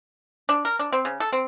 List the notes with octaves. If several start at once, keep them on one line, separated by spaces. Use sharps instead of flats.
D4
A#4
D4
C4
C#3
A4
C4